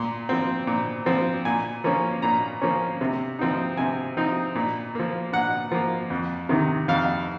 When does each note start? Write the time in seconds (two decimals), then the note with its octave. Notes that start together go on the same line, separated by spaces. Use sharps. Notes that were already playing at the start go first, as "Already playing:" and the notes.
Already playing: A#2 C6
0.29 F3 C4
0.67 A#2
1.06 F3 C4
1.45 A#2 G#5
1.84 F3 A#3 C#4
2.22 A#2 A#5
2.62 F3 A#3 C#4
3.01 C3
3.39 F3 C4 D#4
3.77 C3 G#5
4.17 F3 C4 D#4
4.55 A#2
4.95 F3 A#3
5.33 A#2 F#5
5.72 F3 A#3
6.10 F2
6.49 C3 D#3
6.88 F2 F5